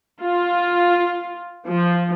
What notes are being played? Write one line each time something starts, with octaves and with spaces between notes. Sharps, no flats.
F4
F3